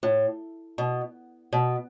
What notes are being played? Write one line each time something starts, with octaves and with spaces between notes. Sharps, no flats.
A2
B2
B2